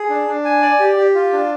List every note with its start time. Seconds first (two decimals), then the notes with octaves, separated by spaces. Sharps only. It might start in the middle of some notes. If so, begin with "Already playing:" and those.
Already playing: G#4
0.10 D4
0.27 D4
0.45 G#5
0.62 D5
0.80 G4
0.97 G4
1.15 F4
1.33 D4